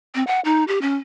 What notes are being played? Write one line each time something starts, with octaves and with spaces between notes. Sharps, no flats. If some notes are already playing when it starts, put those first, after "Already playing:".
C4
F#5
D#4
G4
C#4